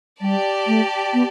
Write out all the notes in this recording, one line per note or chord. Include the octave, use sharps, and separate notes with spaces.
G3 G4 D5 A5
A3
B3